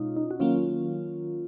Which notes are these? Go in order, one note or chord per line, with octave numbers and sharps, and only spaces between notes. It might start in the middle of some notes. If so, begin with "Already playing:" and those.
Already playing: B2 G#3 C#4 D#4 F4
D#4
F#4
D#3 F#3 A#3 C#4 F4